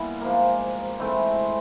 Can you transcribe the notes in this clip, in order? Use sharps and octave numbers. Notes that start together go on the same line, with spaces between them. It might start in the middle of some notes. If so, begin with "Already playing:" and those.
Already playing: A#2 G3 B3 E4 G#5
G#2 F3 A#3
G#2 E3 A3 C4